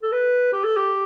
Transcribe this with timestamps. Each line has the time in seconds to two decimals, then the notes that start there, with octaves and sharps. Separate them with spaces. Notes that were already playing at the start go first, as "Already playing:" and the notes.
0.03 A4
0.12 B4
0.53 G4
0.64 A4
0.77 G4